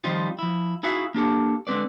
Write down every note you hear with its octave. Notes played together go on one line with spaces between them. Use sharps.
D#3 F3 G3 C4 D#4 F4
F3 E4
D#4 E4 F#4 G#4 E5 F5
A#3 D4 G4 A4
D3 G#3 C4 B4 D5